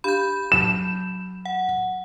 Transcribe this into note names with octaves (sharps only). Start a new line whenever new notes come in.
D4 G4 F5 B5 G6
F#3 A5 E7
F#5